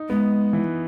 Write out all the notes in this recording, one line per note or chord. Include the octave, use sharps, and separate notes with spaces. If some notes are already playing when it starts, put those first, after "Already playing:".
Already playing: D#4
G#3 B3
E3